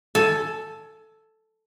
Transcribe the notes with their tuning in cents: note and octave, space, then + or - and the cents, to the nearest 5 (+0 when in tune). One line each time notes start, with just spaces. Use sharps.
A4 +0 G#5 +25